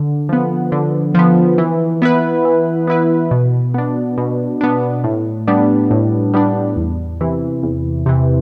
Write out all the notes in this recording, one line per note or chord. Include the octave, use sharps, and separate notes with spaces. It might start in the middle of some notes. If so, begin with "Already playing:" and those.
Already playing: D3
F3 B3
D3
F3 B3
E3
B3 E4 B4
E3
B3 E4 B4
B2
B3 D4
B2
B3 D4
A2
G3 B3 D4
A2
G3 B3 D4
E2
C3 E3
E2
C3 E3